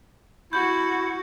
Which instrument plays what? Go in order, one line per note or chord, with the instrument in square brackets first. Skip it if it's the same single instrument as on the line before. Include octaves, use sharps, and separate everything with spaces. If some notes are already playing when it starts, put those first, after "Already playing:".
[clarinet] E4 [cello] F#4 [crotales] G6